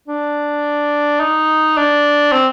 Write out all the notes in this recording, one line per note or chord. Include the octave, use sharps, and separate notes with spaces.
D4
D#4
D4
C4